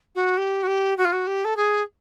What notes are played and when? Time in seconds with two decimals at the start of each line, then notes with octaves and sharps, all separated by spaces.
0.15 F#4
0.37 G4
0.63 F#4
0.67 G4
0.97 F#4
1.05 F4
1.12 F#4
1.27 G4
1.45 A4
1.57 G#4